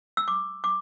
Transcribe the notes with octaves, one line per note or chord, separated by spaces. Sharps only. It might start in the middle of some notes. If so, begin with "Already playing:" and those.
E6
D6
D6